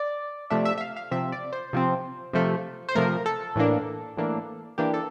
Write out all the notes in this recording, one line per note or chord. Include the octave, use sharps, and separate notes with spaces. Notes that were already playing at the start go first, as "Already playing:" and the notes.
Already playing: D5
C3 F3 A3 D4 E5
E5
E5
F5
F5
C3 F3 C4 E5
D5
C5
C3 F3 C4
C3 F3 A3
C5
C3 F3 A3 A#4
A4
A2 E3 A#3 D4
A2 E3 A#3 D4
E3 A#3 D4 G4
A4